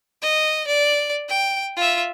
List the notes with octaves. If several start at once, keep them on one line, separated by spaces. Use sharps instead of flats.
D#5
D5
G5
F4 E5